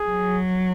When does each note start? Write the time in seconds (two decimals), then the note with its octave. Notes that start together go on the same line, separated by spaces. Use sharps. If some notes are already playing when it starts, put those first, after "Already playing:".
Already playing: G#4
0.08 F#3